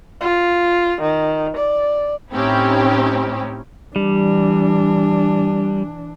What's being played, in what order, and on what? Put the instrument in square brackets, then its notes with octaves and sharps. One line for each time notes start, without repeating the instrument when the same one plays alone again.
[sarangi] F4
D#3
D5
[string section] A2 C4 C#4 D#4 E4 G4
[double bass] E3 D4 [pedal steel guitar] G3